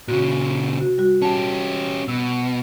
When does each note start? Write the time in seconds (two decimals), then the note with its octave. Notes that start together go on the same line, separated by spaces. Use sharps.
0.08 A#2 C#3 F#4
0.78 C3 F#4
0.98 G3 F#4
1.22 C#4 G4 A5
2.08 B2 E6